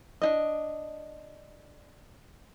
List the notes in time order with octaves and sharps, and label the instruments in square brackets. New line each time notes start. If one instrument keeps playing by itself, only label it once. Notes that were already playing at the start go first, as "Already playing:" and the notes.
[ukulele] D4 D#4 D#5